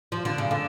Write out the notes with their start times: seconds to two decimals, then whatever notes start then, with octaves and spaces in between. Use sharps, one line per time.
0.12 F3
0.25 D3
0.38 C#3
0.51 D3